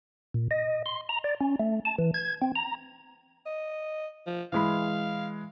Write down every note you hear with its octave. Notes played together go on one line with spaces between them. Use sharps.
A#2
D#5
C6
A#5
D5
C#4
A3
A5
E3
G#6
C4
A#5
D#5
F3
E3 G#3 F5 B5